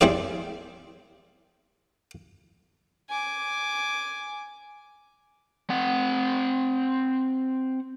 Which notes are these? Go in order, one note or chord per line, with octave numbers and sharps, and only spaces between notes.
G3 C4 E4 G#4 D5
G#5 D6
C4 F#5